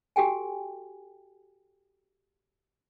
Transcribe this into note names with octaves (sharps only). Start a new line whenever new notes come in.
F#4 G4 A4 G5 G#5